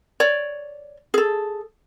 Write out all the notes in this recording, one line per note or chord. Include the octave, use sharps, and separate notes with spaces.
C#5 D5
G#4 A4